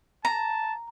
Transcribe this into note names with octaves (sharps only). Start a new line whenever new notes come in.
A5 A#5